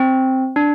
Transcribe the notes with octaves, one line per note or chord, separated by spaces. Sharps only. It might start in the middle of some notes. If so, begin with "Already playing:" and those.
Already playing: C4
D4